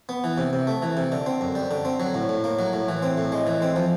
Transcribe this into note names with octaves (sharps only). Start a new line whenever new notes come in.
B3
E3
C3
C3
A3
E3
C3
D3
C4
F#2
G3
D3
C4
F#3
A2
A2
A#3
F#3
A2
E3
C4
A2
G#3
E3
C4
F3